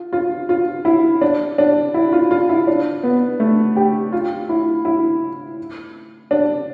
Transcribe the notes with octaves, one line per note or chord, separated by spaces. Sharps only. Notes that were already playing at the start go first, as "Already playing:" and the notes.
Already playing: F4
F4
F4
E4
D4
D4
E4
F4
F4
E4
D4
B3
A3
G4
F4
E4
E4
D4